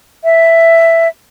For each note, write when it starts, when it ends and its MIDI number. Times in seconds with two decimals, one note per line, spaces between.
0.24 1.08 76